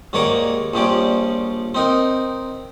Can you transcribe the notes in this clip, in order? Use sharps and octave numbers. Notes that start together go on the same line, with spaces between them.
D#2 G#2 A#3 C#5 D5 A#5
A#1 F3 G3 C#4 D5
C4 D#4 A#4